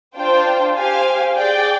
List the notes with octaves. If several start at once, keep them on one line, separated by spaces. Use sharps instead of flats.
D4 F4 C5 G5
G4 C5 F5 G#5
G#4 D5 G5